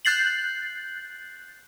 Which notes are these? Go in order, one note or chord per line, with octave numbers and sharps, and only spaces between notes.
F#6 G6 A6 C7 F#7